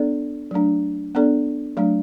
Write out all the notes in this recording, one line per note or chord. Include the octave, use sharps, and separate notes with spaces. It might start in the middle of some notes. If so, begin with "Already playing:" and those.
Already playing: B3 D4 A4 D5
F#3 A3 D4
B3 D4 A4 D5
F#3 A3 D4